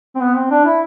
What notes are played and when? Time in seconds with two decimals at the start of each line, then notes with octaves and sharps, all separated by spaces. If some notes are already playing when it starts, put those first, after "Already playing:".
0.15 C4
0.21 B3
0.36 C4
0.51 D4
0.65 E4